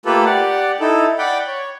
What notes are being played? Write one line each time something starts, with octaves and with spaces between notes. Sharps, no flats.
A3 A#3 F4 G4 A4 B4
G4 D5 F#5
D#4 E4 A4
D5 F#5 G5 B5
C#5